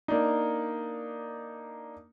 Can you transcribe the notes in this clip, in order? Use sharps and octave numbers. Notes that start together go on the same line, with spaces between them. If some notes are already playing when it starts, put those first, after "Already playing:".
A#3 D4 D#4